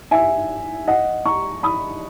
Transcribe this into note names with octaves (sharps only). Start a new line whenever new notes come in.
E5 G#5
D#5 F#5
A#5 C#6
B5 D#6